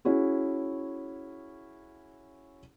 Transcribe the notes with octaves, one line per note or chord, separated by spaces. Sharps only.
C#4 E4 F#4 G#4